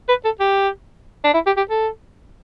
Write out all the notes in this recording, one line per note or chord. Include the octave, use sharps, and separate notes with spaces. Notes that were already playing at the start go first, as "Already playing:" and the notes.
B4
A4
G4
D4
E4
G4
G4
A4